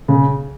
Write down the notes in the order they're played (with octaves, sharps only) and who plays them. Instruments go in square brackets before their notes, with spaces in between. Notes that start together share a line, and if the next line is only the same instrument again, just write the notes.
[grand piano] C#3